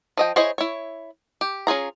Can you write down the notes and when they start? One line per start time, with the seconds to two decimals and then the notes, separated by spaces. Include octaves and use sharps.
0.17 F3 D#5 G5
0.36 E4 G#4 C5 C#5 D#5
0.58 E4 C#5
1.41 G4
1.67 C#4 F4 G#4 A#5